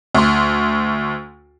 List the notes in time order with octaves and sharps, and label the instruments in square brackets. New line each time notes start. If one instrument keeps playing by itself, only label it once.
[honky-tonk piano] D2 C6